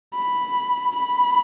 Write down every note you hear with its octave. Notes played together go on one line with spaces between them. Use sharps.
B5
B5